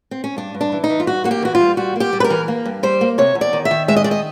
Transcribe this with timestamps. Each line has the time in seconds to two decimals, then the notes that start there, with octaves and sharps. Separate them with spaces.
0.11 C4
0.24 C#4
0.37 G2 D4
0.55 G2
0.61 D4
0.72 E3
0.84 D#4
0.90 E3
1.00 F4
1.07 G2 F#4
1.24 A#3 F#4
1.31 G4
1.42 E3 F#4
1.55 F4
1.60 G3
1.77 G3 F#4
1.96 A#3 G4
2.13 G3
2.20 B4
2.24 A#4
2.30 E3
2.48 A#3
2.66 G2
2.83 G3 C5
3.01 A#3
3.18 C3 C#5
3.35 E2
3.41 D5
3.53 D#3
3.65 E5
3.71 D#3
3.88 G#3 E5
3.96 D#5
4.04 D#3 D5
4.11 D#5